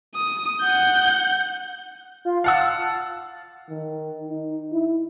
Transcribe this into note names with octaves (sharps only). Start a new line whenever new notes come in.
D#6
F#5 G6
F4
F5 F#5 A5 E6
D#3
D#4
E4